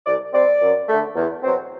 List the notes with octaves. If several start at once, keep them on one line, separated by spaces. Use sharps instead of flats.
C2 D5
C3 G3 C4 D5
F#2
D3 A3
E2
B2 F#3 C4